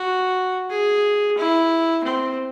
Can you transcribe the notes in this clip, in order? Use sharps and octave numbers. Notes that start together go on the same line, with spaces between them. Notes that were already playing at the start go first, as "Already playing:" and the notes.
Already playing: F#4
G#4
E4
C4